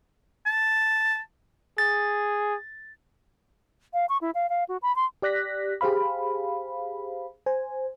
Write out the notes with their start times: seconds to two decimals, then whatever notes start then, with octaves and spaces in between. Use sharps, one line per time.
0.46 A5
1.78 G#4 A6
3.93 F5
4.09 C#6
4.21 E4
4.35 F5
4.49 F5
4.68 F#4
4.82 B5
4.96 C6
5.22 G4 D5 F#6 A#6 B6
5.81 G4 G#4 C5 F5 B5
7.46 C5 G#5